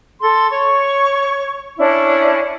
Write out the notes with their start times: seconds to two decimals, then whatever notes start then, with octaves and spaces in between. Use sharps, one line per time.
0.19 A4 C6
0.50 C#5 C#6
1.77 C#4 D4 E4